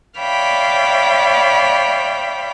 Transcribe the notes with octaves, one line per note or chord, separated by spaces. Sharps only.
C#5 D5 E5 F5 G5 B5